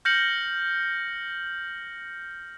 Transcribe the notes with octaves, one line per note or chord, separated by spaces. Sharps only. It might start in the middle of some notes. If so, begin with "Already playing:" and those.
F6 G6 A#6 C#7 F#7